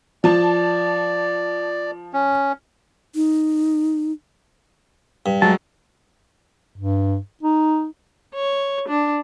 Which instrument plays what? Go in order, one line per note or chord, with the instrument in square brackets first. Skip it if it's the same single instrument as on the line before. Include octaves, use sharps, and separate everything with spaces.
[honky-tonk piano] F3 A5 [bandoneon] D5
[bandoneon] C#4
[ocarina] D#4
[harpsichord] G2
[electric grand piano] F#3 G#3 [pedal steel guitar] A5
[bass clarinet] G2
D#4
[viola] C#5
D4